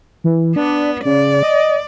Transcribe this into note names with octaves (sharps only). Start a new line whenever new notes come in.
E3
B3 D4
C#3 D5
D#5